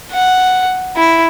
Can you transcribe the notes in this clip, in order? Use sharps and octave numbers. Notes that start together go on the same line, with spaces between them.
F#5
E4